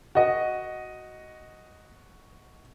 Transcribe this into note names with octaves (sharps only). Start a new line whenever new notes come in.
F#4 D#5